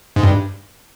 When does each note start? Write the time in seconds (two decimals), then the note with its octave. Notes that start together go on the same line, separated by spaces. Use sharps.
0.16 G#2
0.23 G2